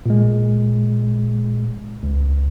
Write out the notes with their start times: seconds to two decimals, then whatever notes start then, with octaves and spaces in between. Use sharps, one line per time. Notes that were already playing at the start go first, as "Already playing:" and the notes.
0.06 A#2 G#3
2.03 C#2